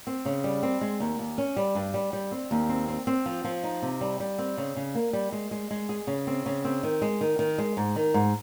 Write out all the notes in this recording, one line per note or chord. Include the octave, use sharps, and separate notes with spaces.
C4
C#3
G3
C4
G#3
D#2
D#2
C#4
G3
G2
G3
G3
C4
D#2
C4
C4
C4
F3
F3
D#4
C3
G3
G3
C4
C#3
C#3
A#3
G3
G#3
G#3
G#3
G#4
C#3
C4
C#3
C4
D#3
G#3
D#3
D#3
G#3
G#2
D#3
G#2